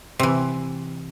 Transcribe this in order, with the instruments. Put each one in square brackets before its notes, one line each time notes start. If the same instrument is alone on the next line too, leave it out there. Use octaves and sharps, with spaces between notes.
[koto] C3 E3